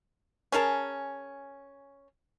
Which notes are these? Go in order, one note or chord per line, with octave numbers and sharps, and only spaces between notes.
C#4 G#4 A#4 A5